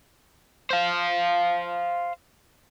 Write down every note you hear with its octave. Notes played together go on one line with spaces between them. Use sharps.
C5 F5